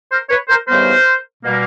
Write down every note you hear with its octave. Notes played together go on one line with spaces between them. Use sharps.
A#4 C5
B4 C#5
A#4 C5
D#2 C#3 E3 G3 B3 A#4 C5
B2 G3 A#3